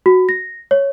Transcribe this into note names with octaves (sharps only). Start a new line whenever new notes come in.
F#4
A#6
C#5